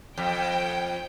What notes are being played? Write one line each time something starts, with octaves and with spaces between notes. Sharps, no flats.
F2 G5